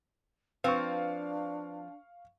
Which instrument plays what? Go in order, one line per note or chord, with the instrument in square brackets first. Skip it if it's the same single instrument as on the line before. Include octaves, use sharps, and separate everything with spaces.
[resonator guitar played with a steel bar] F3 C4 [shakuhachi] D4 [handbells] B4 [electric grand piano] F5 C#6